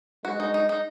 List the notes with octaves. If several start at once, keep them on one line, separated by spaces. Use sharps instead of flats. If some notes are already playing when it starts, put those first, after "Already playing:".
G#3 F#4
D#4
D#4
D#4